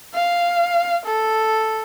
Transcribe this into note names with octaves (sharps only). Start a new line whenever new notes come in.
F5
A4